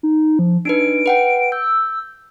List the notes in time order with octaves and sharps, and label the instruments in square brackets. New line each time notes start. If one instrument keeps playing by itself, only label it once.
[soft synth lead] D#4
F3
[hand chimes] D4 D#4 B4 [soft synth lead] D7
[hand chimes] B4 F#5 G5
[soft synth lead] E6 [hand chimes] G6